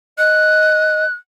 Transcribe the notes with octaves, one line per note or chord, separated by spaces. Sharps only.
D#5 F#6